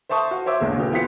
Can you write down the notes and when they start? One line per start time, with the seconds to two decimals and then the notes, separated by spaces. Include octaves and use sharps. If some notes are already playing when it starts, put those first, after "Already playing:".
0.09 C5 E5 A5 C#6 D#6
0.31 F#4 F5
0.46 C5 C#5 E5 D6 E6
0.60 A#1 E2 G#3
0.77 F1 B2 G4
0.92 E3 B3 F4 C5 B6 C#7